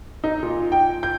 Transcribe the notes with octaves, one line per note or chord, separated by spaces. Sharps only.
D#4
A#2
G5
G6